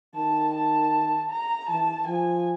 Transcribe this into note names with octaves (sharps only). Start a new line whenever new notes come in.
D#3 A5
A5
A#5
E3 A5
F3 G#5